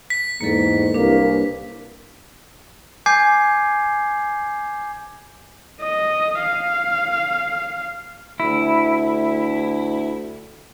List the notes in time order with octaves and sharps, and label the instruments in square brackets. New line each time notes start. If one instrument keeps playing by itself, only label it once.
[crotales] B6
[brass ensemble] E2 G#2 [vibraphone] A#3 A4
[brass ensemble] C2 [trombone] A#3 [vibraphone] D4 B4
[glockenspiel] G#5 D6 G6 G#6 C7
[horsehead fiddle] D#5
F5
[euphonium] D2 [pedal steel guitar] E4